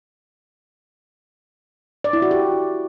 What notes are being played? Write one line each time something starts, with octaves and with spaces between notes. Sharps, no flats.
D5
E4
F#4
G4